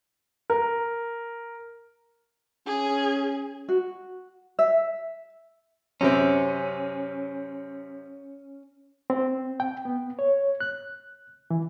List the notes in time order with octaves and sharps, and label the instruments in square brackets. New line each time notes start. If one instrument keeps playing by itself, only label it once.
[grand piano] A#4
[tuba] C#4 [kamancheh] G#4
[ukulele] F#4
E5
[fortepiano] F#2 C3 C4 [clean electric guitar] C#4
[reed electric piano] C4
G5
B3
C#5
F#6
E3